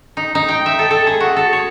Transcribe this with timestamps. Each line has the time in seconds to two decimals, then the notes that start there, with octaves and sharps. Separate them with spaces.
0.17 D#4
0.35 D#4
0.48 G5
0.66 E5
0.79 A4
0.91 A4
1.07 G#4
1.20 F#4
1.36 A4
1.53 C#5